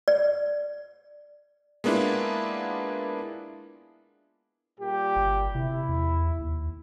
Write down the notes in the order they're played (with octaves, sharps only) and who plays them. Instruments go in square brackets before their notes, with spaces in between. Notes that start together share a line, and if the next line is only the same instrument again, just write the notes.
[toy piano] D5
[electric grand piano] G#3 A#3 B3 D4 E4 F4
[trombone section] A#2 G3 G4
[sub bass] G1
[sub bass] C3 [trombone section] E4
[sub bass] E2
D#2